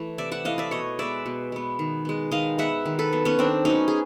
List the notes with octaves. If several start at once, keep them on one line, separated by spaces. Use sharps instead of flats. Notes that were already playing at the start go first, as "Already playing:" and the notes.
Already playing: E3 A3
C3 D5 E5
E5 F#5
E3 A3 D#5 F5
D5 E5
B2 C#5 D#5
G#3 B3 D5 E5
B2
G#3 B3
D#3
G#3 B3
D#3 D#5 F5
G#3 B3 E5 F#5
D#3
A4 B4
F#3 B3
B3 C#4
D#3 C4 D4
F#3 B3 C#4 D#4
G#4